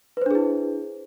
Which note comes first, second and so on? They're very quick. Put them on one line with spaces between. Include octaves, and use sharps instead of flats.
B4 C5 D4 G#4 E4